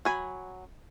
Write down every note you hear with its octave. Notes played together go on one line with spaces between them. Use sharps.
F#3 G#5 B5